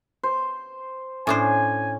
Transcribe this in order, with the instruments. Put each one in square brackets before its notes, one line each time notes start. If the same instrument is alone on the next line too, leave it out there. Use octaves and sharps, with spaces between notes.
[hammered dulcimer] C5
[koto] A2 D4 C5 [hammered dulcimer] C#4 [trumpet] G#5